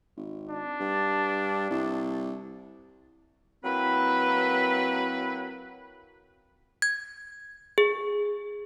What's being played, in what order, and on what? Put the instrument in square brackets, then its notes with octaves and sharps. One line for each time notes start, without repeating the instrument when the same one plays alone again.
[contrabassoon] G#1
[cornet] D4
[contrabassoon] G2
C2
[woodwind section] F#3 A#3 C4 E4 B4
[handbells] G#6
G#4